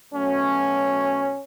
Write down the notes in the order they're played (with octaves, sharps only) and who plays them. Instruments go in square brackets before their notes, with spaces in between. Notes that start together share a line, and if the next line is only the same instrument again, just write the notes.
[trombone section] B2 F#3 A3 C#4